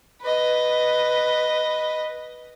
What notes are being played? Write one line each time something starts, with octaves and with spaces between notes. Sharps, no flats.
B4 D#5